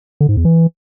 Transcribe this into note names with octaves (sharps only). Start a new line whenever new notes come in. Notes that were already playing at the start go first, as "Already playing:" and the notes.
D3
G#2
E2
E3